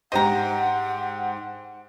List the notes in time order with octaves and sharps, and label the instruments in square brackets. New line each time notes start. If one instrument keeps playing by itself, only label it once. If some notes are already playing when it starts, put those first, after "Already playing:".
[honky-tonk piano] G#2 G4 C5 [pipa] D#5 A#5 [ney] F#5